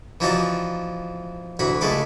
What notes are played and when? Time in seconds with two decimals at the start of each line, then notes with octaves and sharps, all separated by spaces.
0.20 E3 F3 C4 D#4 F#4 D5
1.59 D2 E3 F#4 B5
1.81 C#2 G#3 A3 B5 D6